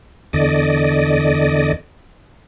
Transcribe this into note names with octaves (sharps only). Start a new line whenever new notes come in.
E2 D3 D5 D#5